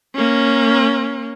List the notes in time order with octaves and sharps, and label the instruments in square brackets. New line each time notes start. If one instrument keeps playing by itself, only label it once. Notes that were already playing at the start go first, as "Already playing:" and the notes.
[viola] A#3 C#4